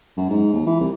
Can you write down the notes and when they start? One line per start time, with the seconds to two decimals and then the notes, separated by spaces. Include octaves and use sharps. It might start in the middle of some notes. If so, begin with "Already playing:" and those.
0.17 F#2
0.29 G#2
0.53 D#2
0.66 E3
0.80 C2